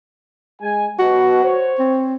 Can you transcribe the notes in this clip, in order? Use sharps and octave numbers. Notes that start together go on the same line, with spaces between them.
G#3 G#5
B2 F#3 F#4
C5 C#5
C4